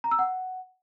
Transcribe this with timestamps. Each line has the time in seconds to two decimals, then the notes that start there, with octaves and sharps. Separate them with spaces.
0.04 A#5
0.11 E6
0.19 F#5